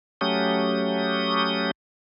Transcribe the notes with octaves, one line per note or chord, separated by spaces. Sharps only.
F#3 A3 C#4 G4 D#6